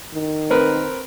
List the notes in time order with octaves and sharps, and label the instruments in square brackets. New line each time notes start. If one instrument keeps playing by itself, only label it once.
[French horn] D#3
[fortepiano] C4 A#4 B4